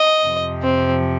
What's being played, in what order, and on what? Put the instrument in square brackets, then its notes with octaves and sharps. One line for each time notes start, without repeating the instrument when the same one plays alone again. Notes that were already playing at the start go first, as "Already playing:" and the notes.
Already playing: [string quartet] D#5
F2 C3 F3
C4